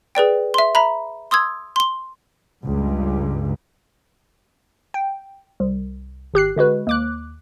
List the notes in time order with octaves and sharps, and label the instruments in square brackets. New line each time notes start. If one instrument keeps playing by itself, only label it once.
[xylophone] G#4 B4 D5 G5
E5 C6
E5 A#5 B5
C6 D#6 E6 G#6
C6 G7
[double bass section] C#2 G2
[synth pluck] G5
C2
G#1 G4 F#6 C7
D3 G#3 F#4 B4
D#2 D6 F#6